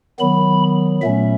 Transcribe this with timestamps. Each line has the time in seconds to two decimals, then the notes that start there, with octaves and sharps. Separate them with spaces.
0.20 D#3 F#3 B3 B5
1.02 A#2 F#3 A3 C#4 E5